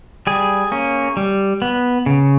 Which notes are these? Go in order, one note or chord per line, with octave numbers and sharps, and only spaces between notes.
G3 G#4
A#3 C#4
G3
B3
C#3